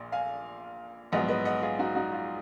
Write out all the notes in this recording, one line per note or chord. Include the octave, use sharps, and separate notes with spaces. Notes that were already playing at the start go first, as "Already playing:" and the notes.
Already playing: A#1 A#2
F5 G#5
A#1 G#2 F#3 B3 D#5 F#5
B4 D#5
D#5 F#5
F4 G#4
D#4 F#4
D#4 F#4
F4